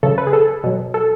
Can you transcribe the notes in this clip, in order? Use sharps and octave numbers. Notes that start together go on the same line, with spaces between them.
C#3 F#3 A4
B4
G#4
A4
B2 F#3
A4